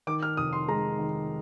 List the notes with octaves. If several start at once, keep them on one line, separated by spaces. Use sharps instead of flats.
D#3 D6
F6
F1 D#6
C6
G#3 A#5
D#3